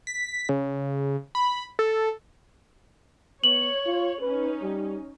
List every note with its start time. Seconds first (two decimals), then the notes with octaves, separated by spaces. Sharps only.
0.07 B6
0.49 C#3
1.35 B5
1.79 A4
3.44 B3 C#5 F#7
3.86 F4
4.21 C#4 D#4 B4
4.62 G3